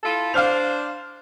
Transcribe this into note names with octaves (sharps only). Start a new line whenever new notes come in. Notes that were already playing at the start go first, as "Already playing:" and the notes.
E4 F4 A4
D4 C5 F5 F6 F7